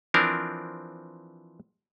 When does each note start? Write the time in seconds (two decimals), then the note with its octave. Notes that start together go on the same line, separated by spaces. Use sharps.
0.14 E3 F3 C4 D4 A#4